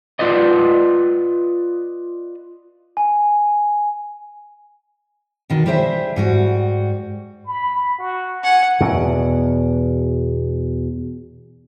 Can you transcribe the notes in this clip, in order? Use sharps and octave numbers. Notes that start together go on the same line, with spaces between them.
F4 B4 D5 D#5
G#5
B2 D#3 F#4
G3 G4 G#4 C5 D#5 E5
G#2 G3 F#4
B5
F#4
F#5 G#5
E2 B2